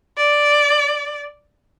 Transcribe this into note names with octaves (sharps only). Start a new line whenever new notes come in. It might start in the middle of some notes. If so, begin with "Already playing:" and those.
D5